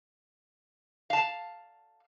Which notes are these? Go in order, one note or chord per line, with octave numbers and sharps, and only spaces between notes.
F5 A5